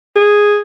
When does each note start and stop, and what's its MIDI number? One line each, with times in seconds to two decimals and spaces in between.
0.16 0.60 68